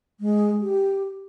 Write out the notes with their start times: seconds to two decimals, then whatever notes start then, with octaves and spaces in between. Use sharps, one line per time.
0.20 G#3
0.62 G4